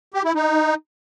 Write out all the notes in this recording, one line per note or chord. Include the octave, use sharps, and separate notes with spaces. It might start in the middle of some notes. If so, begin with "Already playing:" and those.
G4
E4
D#4